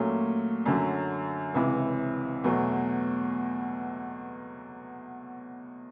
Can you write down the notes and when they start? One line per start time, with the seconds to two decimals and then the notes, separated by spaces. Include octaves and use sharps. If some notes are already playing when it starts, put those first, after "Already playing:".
Already playing: A#2 F#3 A3 C#4
0.66 F#2 D3 F#3
1.55 C#2 C3 E3
2.44 E2 B2 F#3 A3